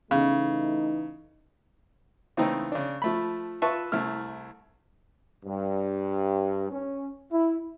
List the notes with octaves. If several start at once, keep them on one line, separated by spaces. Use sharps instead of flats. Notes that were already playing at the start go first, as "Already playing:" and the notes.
C#3 E3 A3 D#4
C#3 E3 A3 C4 D#4 E4
C#3 D4
F3 A3 B5
F4 B4 E5 A5 C#6
C2 A3 E4 F6
G2
C#4
E4